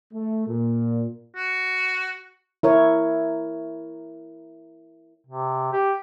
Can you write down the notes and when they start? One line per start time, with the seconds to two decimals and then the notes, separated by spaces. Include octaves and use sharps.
0.14 A3
0.48 A#2
1.36 F#4
2.63 E4 A#4 C#5
5.27 C3
5.73 G4